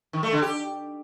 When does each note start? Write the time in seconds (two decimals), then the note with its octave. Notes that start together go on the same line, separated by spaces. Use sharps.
0.13 D#3
0.23 A3
0.32 D3
0.42 G4